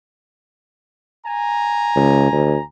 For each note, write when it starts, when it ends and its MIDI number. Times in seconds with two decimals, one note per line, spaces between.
1.25 2.64 80
1.25 2.64 82
1.96 2.30 37
2.33 2.56 38